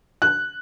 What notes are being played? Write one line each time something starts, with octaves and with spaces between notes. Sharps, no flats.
F#6